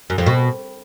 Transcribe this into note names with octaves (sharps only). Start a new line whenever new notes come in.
F#2
F2
B2